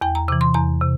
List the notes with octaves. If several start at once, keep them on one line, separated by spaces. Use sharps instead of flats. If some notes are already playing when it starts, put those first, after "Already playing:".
E2 G5
A#5
C3 E3 D6
C6
E2 A#5
C3